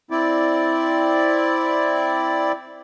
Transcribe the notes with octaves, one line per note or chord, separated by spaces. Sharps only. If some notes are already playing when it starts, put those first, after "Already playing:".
C4 E4 D5